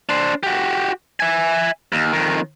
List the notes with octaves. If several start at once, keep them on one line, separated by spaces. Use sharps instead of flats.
D4 C5
F#4 G4
E5 G#5
D#2
F2 D#3